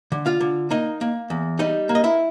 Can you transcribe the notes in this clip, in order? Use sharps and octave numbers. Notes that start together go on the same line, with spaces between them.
D3
F4 F5
D3
A#3 D#4 D#5
A#3
E2
G3 D#4 D#5
A#3
D#5
E4 E5